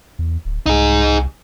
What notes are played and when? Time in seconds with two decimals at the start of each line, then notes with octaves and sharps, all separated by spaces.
0.19 E2
0.45 D1
0.66 C2 D#4 G#4